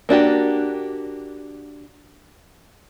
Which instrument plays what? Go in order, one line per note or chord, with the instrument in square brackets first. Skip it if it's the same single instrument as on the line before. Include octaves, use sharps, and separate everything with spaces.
[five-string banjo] A#3 D4 F#4 G4